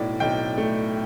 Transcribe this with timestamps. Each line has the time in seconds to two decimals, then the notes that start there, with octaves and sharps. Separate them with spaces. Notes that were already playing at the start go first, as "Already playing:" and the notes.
Already playing: B1 A2 D5
0.20 B1 G5
0.58 A3